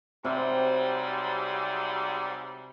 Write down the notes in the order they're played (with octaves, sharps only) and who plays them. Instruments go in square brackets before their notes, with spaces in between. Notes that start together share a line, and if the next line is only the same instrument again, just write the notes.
[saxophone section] G#2 F#3 G3 [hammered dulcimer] C3